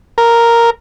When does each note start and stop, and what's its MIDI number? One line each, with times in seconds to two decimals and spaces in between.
0.18 0.70 70